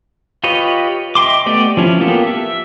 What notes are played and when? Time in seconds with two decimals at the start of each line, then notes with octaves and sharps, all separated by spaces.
0.44 F4 G4 B4 C#5 D#5
1.15 D#5 E5 G5 C6 D6
1.46 A3 B3 G4 D5
1.77 F3 C#4 E4
2.00 A#3 B3 F4 G4 A4
2.27 E5